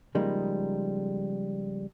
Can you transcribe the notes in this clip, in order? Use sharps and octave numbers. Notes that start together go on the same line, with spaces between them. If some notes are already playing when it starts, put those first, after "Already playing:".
C#3 F3 G3 G#3 A#3 D#4